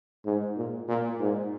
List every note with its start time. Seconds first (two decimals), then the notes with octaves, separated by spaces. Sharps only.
0.26 G#2
0.57 A#2
0.88 A#2
1.20 G#2